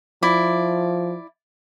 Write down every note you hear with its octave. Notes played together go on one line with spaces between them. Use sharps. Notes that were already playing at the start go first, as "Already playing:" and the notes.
F3 E4 D5